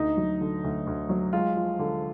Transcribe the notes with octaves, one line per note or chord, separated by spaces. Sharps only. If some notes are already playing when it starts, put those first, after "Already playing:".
Already playing: D2 D#4
F#3
D3
D2
D2
F#3
G#3 F4
F3
D3